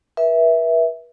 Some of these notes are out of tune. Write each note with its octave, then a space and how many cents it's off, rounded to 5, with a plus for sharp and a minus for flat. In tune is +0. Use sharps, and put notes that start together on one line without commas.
B4 -40 E5 -5